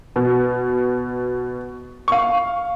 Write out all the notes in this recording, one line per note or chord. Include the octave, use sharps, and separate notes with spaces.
B2
F5 C#6